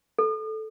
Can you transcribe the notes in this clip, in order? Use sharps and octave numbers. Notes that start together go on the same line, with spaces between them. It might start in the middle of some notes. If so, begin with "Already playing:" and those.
A4